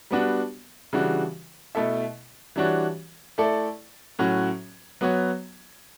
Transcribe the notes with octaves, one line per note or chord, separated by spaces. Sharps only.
G3 B3 D4 F#4
C#3 E3 G3 D4 F#4
B2 A3 E4 A4 E5
E3 G3 D4 F#4 C#5
A3 E4 A4 D5
A2 F#3 C#4 F#4
F#3 B3 F#4 C#5